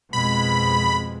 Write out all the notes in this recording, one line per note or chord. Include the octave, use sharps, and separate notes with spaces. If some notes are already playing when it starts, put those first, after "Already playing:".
F2 B2 G#3 B5